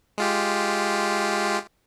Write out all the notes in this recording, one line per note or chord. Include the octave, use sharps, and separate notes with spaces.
G#3 F4 G4